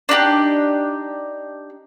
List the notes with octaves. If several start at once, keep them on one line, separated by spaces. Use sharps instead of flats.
D4 D#4 F#4 G4